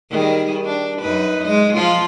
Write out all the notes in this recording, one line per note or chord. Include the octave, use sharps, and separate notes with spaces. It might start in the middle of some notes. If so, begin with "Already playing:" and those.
D#3 G3 G#4
D4
F#2 D#4 B4
G#3 D#5
F3 F4